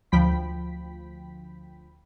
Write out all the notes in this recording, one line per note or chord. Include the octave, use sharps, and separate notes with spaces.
D2 F3 G5 B5 B6